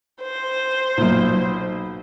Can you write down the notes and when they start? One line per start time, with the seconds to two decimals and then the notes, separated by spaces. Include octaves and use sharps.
0.23 C5
0.97 B1 A#2